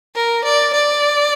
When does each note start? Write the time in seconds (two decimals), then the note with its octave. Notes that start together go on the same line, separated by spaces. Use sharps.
0.15 A#4
0.44 D5
0.74 D5